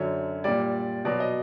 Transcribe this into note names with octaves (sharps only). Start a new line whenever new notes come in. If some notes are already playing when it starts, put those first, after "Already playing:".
Already playing: F#2 D3 F#3 C#5
A#2 G3 D5
B2 F#3 D5
D#5